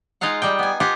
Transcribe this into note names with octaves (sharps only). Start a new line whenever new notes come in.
G#3 D#4 F4 F5 F#5
G3 D#4 G5
B3 G#5
F4 G4 F#5 G#5